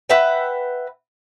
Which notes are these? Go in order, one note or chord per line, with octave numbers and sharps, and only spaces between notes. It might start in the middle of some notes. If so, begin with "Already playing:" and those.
B4 E5 F#5 G5